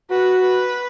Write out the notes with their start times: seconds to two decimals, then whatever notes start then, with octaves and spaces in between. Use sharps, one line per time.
0.11 F#4 B4
0.41 B4